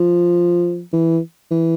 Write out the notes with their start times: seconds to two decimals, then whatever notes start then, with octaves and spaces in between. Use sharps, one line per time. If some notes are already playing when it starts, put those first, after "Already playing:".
Already playing: F3
0.93 E3
1.51 E3